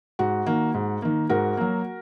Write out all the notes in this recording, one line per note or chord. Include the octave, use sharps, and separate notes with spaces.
G#2 F#4
D#3 A#3
G#2
D#3 A#3
G#2 F#4 A#4
F#3 A#3